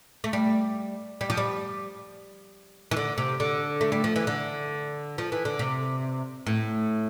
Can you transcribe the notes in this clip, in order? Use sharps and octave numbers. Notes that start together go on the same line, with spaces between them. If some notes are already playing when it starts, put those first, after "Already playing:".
A3
G3
G3
F3
G3
E3
D3
C3
D3
A3
G3
F3
E3
D3
F3
E3
D3
C3
A2